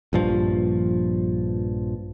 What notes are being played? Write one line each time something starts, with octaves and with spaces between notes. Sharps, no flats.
A#1 G2 F3